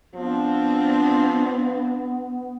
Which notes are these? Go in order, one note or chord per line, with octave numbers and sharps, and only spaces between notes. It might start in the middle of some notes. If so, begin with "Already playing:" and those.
F3 B3 C4 D4